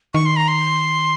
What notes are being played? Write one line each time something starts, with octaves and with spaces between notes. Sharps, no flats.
D#3 C#6
C6
A#5
C6